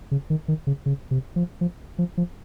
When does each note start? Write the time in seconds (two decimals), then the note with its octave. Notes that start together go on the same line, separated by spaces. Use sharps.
0.11 C#3
0.30 D#3
0.48 D#3
0.67 C#3
0.86 C#3
1.11 C3
1.36 F3
1.61 F3
1.98 F3
2.17 F3